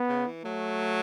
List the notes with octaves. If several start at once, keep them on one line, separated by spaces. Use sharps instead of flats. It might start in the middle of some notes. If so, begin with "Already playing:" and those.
Already playing: B3
C#3
E3
F#3 A3